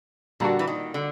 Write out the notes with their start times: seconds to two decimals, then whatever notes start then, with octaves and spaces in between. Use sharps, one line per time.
0.40 A#2 D3 G3 A#3 D4 F#4
0.59 E3
0.67 D#3
0.94 D3